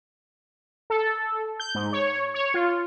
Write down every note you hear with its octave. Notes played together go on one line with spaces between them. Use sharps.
A4
G6
G#2
C#5
C#5
F4